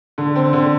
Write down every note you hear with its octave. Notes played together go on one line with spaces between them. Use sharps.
D3
C4
D3